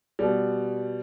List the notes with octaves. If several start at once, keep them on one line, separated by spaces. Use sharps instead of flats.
B2 G3